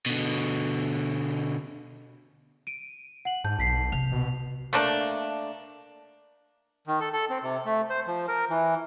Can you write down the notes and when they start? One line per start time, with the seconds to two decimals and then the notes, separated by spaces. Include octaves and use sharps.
0.06 B2 D3
2.67 D7 D#7
3.25 F#5 F#7
3.44 G#2 A5 G6
3.59 B1 A5 B6 C7
3.92 C3 F7
4.12 B2
4.73 A3 A#3 D4
6.87 D#3
7.00 A4
7.13 A4
7.30 C4
7.43 C3
7.65 A3
7.90 C5
8.07 F3
8.28 A#4
8.50 E3